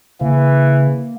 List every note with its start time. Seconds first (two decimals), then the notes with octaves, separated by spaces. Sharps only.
0.21 C#3 E3 A#3